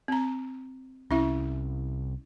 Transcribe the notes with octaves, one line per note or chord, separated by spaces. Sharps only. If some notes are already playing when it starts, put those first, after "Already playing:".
C4 A#5
C2 C#4 E4 E5